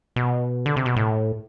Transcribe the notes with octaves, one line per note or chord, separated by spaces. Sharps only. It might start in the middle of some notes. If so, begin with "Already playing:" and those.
B2
D3
C3
B2
A2